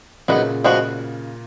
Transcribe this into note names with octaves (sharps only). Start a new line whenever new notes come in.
A#2 C#3 F#3 B3 D#4 F#4 B4
F3 G#3 B3 F#4